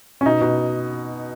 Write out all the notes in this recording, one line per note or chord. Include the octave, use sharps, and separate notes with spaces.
C#4
B2 D#4
B2